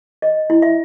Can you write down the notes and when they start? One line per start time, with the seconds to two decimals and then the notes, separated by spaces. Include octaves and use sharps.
0.22 D#5
0.50 E4
0.62 E5